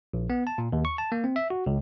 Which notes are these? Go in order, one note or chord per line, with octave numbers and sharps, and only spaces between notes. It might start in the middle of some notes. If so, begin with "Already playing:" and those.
A#1
B3
A5
A#2
D#2
C#6
A5
A#3
C4
E5
F#4
C#2